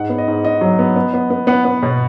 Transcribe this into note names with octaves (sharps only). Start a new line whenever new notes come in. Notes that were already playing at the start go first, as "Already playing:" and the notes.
Already playing: G#2 F#5
B3
D#5
G#2
G#2 D#5
F#3
B3
B3
B3
B3
B3 F#5
B3
B2